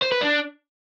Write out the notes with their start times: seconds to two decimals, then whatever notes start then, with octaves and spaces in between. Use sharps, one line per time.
0.02 C5
0.12 B4
0.21 D4